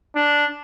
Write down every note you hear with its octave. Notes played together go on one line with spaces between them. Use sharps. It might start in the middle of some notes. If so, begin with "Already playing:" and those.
D4